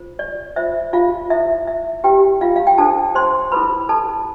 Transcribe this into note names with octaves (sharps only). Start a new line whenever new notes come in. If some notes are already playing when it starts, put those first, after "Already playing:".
Already playing: F4 C5
D5
F4 C5 E5
F4 F5
E4 A4 C5 E5
E5
E4 G4 B4 G5
F4 F5
F5
G5
D4 A4 C5 A5
C5 C6
E4 A4 B4 C5 B5
A4 A5